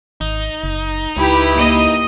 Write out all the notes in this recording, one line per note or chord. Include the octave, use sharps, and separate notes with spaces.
G#1 D#4
F#1
C#2 E4 G4 B4
A#3 D#5